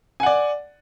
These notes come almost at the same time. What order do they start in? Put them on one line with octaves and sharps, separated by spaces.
G#5 F#5 D5